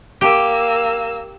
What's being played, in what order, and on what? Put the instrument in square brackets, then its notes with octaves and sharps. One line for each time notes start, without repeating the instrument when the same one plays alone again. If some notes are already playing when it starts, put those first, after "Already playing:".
[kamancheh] A#3 E6 [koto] G4